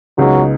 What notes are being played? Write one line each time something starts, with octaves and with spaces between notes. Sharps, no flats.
C#2 C#3 F#3 G#3 B3 D#4